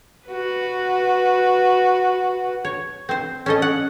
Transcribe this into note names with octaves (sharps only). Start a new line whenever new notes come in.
F#4 B4
C#5
C4 C5
C#4 A4 D#5
F#5